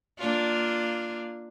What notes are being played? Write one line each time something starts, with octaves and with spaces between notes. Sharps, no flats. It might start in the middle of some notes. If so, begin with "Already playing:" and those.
A#3 D4 F4